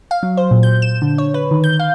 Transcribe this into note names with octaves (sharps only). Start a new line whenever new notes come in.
F5
F#3
C5
A#2
G6
E7
D3
C#5
B4
D#3
G6
F5